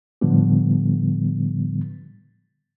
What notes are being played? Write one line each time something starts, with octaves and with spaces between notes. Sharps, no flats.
A2 D3 F3 G3 B3